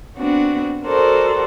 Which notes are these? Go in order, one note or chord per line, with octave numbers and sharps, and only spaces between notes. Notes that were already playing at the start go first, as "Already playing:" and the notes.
B3 C4 D4 F#4
F#4 A4 A#4 C5 D5